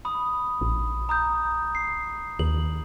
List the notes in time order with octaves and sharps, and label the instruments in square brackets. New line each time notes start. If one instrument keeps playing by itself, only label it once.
[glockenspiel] B5 D#6
[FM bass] A#1
[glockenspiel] A#5 D#6 G6
C7
[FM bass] D#2 [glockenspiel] F#7